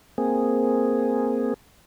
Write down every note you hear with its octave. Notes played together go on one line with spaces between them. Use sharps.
A#3 C4 G#4